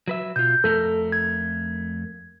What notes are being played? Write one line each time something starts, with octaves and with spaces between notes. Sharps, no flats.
F#3 B4 E5
B2 F4 G6
F2 A3 A4 A#4
G#6